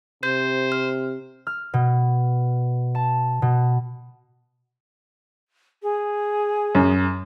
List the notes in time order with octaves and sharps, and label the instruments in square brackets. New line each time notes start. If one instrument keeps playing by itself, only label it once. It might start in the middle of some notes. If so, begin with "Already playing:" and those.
[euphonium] C3 [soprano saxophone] C5 [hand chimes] G6
[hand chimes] F6
[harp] F6
B2
A5
B2
[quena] G#4
[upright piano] F#2